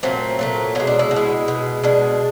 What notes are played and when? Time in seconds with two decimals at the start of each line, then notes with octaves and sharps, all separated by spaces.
0.03 A#2 F#3 A3 C4
0.39 A#2 F#3 A3
0.75 B2 C#4
0.80 G#3
0.87 D4
0.99 E4
1.11 B2
1.16 G#3
1.48 B2 G#3
1.83 B2 G#3 D4